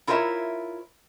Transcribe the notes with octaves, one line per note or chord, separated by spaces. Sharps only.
E4 F4 A#4 C5 C#5 E5